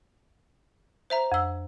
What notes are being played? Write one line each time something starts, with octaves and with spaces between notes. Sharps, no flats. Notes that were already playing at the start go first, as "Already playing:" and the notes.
C5 E5 A#5
F2 E6